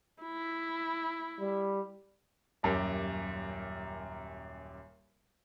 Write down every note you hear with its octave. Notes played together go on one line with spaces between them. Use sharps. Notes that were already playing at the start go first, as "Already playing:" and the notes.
E4
G3
D#1 F#2 G4 A#4